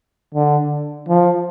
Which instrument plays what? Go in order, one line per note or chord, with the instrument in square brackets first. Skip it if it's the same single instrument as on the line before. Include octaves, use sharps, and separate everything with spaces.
[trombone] D3
F3